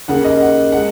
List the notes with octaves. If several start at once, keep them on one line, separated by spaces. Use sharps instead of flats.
D#2 C#3 A#3 F#5
D#5
F#5
F#5
G#3